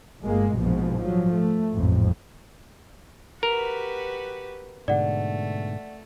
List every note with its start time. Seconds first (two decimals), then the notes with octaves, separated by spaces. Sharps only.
0.21 G1 G#3 A#3
0.57 A#1 G#2 B2 F3
0.99 F3 F#3
1.35 A3
1.72 A1 F2 G#2
3.43 F#4 G4 A#4 B4
4.88 G#2 B2 D3 A3 D5 F#5